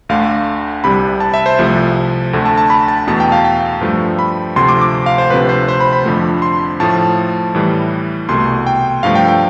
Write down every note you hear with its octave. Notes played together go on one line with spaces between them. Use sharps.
D2 D3 A3 F5
C2 C3 G3 B5
A5
E5
C5
C2 C3 F3 A3
D2 D3 A3
A5
A5
B5
A5
E2 B2 A3 A5
G5
F5
G5
G2 F3 A3
B5
D2 C3 F3 A3 C6
D6
D6
F5
C5
D2 C3 F3 A3 B4
C5
C5
B5
B5
F2 D3 F3 A3
C6
A2 F3 A3 A5
A2 E3 G3
C2 B2 A3 C6
G5
G2 F3 A3 F5
G5
G5